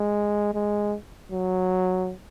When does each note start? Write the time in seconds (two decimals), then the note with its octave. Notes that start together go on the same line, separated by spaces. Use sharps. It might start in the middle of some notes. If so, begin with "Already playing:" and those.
Already playing: G#3
0.54 G#3
1.32 F#3